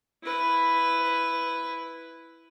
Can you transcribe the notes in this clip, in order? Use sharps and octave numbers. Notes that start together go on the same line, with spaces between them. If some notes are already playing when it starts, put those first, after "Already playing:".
E4 B4